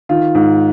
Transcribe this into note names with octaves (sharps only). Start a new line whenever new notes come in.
D#3 F4
G#2